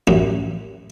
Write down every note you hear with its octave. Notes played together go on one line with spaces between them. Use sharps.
A1 F#2